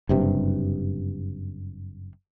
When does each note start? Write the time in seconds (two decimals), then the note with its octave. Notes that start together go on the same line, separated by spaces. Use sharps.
0.09 F#1 G2 C3